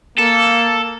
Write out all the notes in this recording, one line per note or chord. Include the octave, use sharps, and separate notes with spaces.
A#3 A4